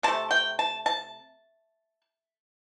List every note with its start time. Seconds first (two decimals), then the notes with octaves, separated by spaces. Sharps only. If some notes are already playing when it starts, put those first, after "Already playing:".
0.03 C3 A3 A5
0.31 G5
0.59 A5
0.86 A5